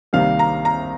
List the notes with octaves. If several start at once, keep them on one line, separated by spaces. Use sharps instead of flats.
C2 C3 D#3 G3 A#3 F5
A#5
A#5